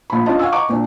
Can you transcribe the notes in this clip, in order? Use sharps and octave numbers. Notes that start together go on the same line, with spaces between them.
A#1 B5
C#4 D4 F4 C5 D#5 A5
F5 F#5 G#5 C#6 E6
D#5 F#5 A5 A#5 C#6 D6
A#2 D4